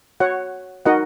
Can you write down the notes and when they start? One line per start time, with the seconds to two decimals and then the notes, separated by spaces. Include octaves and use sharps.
0.20 F#4 C#5 F#5
0.85 D#4 F#4 A#4 D#5 F#5